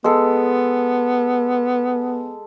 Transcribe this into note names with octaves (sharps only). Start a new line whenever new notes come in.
G#3 B3 A4